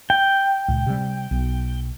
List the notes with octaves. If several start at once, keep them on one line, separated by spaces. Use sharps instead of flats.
G5
C#2 A#2
C3 G3
B1